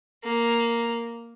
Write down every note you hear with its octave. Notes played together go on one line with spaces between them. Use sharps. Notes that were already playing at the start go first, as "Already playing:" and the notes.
A#3